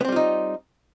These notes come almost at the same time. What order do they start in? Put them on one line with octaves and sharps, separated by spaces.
B3 C4 G3 F4 D#4